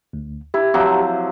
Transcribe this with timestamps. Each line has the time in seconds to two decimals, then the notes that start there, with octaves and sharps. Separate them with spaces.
0.13 D2
0.54 E4 G4
0.74 C3 F3 F#3